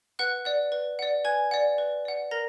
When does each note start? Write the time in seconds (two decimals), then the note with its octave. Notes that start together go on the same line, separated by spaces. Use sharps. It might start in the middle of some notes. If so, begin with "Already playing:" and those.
0.19 B4 F#5 F#6
0.45 D5 F#5
0.72 B4
0.99 D5 F#5
1.25 B4 G#5 G#6
1.51 D5 F#5
1.78 B4
2.05 D5 F#5
2.31 A#4 A#5 A#6